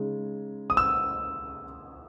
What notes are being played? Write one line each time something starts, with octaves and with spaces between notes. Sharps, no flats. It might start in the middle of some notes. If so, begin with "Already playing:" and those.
Already playing: C#3 G#3 D#4
D#6
E6